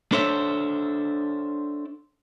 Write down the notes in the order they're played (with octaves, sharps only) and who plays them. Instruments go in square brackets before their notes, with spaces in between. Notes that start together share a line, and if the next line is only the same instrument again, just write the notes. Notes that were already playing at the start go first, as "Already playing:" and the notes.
[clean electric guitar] D4 A4 C5 C#5 E5